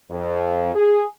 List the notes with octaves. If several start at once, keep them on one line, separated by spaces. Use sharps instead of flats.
F2
G#4